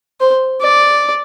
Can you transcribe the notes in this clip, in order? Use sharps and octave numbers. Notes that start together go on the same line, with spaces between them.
C5
D5